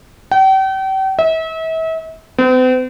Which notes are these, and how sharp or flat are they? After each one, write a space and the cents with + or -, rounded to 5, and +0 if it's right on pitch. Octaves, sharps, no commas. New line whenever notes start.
G5 -40
E5 -35
C4 -45